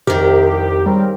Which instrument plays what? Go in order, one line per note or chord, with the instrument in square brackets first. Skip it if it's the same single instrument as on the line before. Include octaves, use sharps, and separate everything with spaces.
[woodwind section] C2 [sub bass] F2 [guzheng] D#3 A#4 [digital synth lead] G4
[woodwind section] C#3 C4 A#4 [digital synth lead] G3